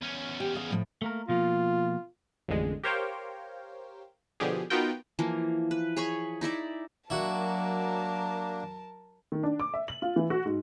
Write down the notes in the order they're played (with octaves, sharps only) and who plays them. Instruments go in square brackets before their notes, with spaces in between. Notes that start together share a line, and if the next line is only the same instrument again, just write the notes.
[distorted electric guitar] E2 C#4
[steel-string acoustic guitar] G4
G#4 F5
A2 F3 A3
[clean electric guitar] A3 A#3 A#4
[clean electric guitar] B2 F3 A#3 [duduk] F4
[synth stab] A1 F2 D3 G#3
G4 A#4 C5 C#5 F5 G5
B2 D3 F3 G4 G#4
B3 D#4 F4 F#4 A#4 G5
[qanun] E3 F3 A#3
B4
G#4 C#5 B5 C#6
D#4 E4 D5 E5
[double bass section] F#3 [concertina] A#3 D4 [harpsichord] E4 F#4 [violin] A#4 A5
[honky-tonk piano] D#3
D4
D6
E5
F#7
F4
E3
F#4
G#2